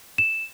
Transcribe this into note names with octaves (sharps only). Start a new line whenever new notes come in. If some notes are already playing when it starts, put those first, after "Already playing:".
E7